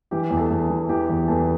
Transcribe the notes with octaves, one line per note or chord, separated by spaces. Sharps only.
E3 G4 G5
E2
A4 A5
E2
E3
E3 G4 G5
E2
E2 A4 A5